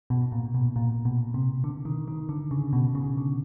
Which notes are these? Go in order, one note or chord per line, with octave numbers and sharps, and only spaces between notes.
B2
A#2
B2
A#2
B2
C3
D3
D#3
D#3
D3
C#3
B2
C#3
D3